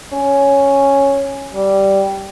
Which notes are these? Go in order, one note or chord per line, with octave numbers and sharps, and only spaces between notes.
C#4
G3